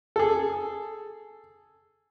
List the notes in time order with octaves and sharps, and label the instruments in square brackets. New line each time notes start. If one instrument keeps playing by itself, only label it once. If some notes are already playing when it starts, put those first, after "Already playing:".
[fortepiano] G#4 A4